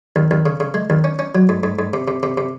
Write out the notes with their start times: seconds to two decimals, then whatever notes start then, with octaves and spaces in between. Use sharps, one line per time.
0.16 D#2
0.31 D#2
0.46 C#3
0.60 C#3
0.74 G#3
0.90 D#2
1.04 C#4
1.19 C#4
1.35 F#3
1.49 G#2
1.63 G#2
1.79 G#2
1.94 C3
2.08 C3
2.23 C3
2.37 C3